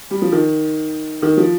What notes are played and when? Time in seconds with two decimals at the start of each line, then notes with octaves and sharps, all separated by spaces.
0.11 G3
0.22 F3
0.32 D#3
1.22 D#3
1.37 F3